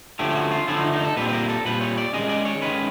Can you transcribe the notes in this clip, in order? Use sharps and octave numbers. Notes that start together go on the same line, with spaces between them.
D3 F3 A3 C#4 G4
G4
F#4
F4
D3 F3 A3 C#4 E4
D#4
D#4
A4
A#2 G3 C4 B4
B4
A#4
A4
A#2 G3 C4 B4
C#5
D5
D#3 G#3 C#4 D#5
D5
C#5
D#3 G#3 C#4 B4